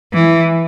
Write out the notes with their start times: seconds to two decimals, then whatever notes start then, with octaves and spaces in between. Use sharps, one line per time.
0.13 E3